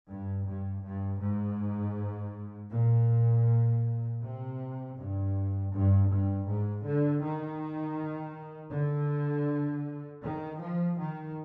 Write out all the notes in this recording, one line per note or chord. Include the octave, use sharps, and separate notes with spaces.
G2
G2
G2
G#2
A#2
C3
G2
G2
G2
G#2
D3
D#3
D3
D#3
F3
D#3